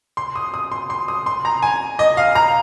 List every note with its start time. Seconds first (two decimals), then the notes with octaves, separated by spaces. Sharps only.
0.17 C6
0.36 D#6
0.54 D#6
0.72 C6
0.90 C6
1.08 D#6
1.26 C6
1.45 A#5
1.63 G#5
1.99 D#5
2.17 F5
2.35 A#5